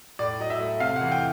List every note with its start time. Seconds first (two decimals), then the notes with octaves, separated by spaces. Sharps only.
0.19 A2 D5
0.40 F#3 D#5
0.50 E5
0.60 A3
0.80 C3 F5
0.96 F#5
1.01 E3
1.12 G5